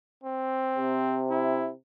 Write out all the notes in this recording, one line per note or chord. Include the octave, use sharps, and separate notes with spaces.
C4
C3
E4